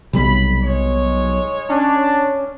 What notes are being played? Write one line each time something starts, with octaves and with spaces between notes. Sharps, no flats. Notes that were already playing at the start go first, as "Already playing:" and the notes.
B1 C3 G3 B5
G#3 C#5
C#4 D4